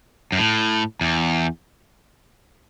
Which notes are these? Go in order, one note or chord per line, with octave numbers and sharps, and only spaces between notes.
F#2
A2
E2